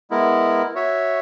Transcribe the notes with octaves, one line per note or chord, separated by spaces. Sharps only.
G#3 B3 E4 A#4
F#4 C#5 E5